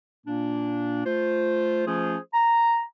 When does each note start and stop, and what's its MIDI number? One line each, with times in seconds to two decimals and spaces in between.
0.26 1.03 46
0.26 1.03 58
0.26 1.03 62
1.06 1.86 57
1.06 1.86 65
1.06 1.86 72
1.87 2.18 53
1.87 2.18 57
1.87 2.18 61
1.87 2.18 65
1.87 2.18 68
1.87 2.18 72
2.34 2.83 82